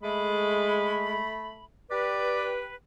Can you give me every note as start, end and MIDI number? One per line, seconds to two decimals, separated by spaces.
0.03 1.20 56
0.03 1.63 57
0.03 1.63 83
1.90 2.75 67
1.90 2.75 71
1.90 2.51 74